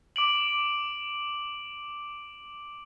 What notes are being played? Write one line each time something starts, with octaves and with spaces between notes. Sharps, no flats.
D6 D7 F#7